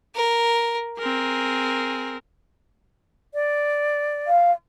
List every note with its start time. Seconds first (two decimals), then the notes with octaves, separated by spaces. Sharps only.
0.15 A#4
0.99 C4 G#4 A#4
3.34 D5
4.27 F5